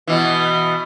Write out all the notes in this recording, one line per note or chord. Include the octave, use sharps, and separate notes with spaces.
B2 E3